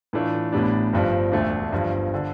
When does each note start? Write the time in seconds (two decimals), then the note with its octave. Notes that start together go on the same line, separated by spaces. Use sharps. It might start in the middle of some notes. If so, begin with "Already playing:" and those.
0.13 A2 E3 A3 D4 F4
0.52 A1 A2 G3 B3 D4
0.93 G1 G2 F3
1.32 E1 D2 D3 A3 D4
1.72 G1 G2 F3
2.14 D3